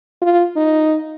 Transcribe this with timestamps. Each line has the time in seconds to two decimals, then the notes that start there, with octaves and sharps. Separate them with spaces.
0.21 F4
0.56 D#4